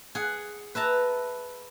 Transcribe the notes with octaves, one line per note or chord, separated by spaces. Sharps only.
G#4 F#5
B4 E5 A5 A#5